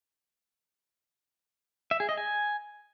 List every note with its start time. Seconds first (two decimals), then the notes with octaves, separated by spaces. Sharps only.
1.91 E5
2.00 G#4
2.09 D#5
2.17 G#5